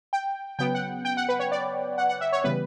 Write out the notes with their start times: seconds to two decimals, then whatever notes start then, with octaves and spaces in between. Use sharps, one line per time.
0.13 G5
0.59 C#3 F#3 B3 G5
0.75 F#5
1.05 G5
1.17 F#5
1.29 B4
1.40 C#5
1.52 D5
1.98 F#5
2.09 F#5
2.21 E5
2.32 C#5
2.44 C#3 E3 G3 B3 B4